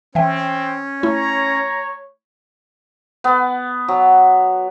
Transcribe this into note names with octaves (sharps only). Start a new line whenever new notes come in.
E3 C4 C#4 E5 G5
A3 E4 C#5 A#5
B3
F#3